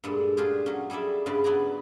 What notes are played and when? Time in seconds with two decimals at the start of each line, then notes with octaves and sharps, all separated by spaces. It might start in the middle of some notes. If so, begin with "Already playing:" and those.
0.04 G2 A#2 G#3 A4
0.37 C#4 D4 F4 G4 G#4
0.66 F#3 C#4
0.90 G3 G#4 A4 D5 E5
1.26 G2 C#3 B4 D5 C6
1.44 F#3 B3 D5 G#5 A#5